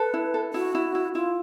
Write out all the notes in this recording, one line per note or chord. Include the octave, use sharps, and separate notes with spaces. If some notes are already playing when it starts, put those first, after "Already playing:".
Already playing: A4 B4
E4
A4
E4 F#4
E4
E4
E4 F4